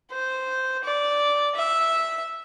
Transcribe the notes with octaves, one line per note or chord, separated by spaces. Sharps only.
C5
D5
E5